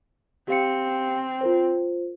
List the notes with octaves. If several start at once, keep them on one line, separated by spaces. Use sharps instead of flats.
C4 G4 F5 C#7
F4 A#4 C5